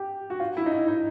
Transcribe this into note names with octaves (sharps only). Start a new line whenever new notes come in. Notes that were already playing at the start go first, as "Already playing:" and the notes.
Already playing: G4
F#4
F4
E4
D#4
E4
D#4